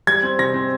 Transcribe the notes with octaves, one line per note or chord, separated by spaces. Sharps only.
G3 G#6
C4
C3 A#6
C4